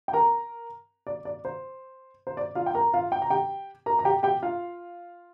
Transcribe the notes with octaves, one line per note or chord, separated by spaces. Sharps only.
G5
A#4 A#5
D5
D5
C5
C5
D5
F4 F5
G5
A#4 A#5
F4 F5
G5
A#5
G4 G5
A#4 A#5
A#5
G4 G5
G4 G5
F4 F5